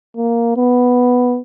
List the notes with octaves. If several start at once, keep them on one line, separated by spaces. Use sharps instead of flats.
A#3
B3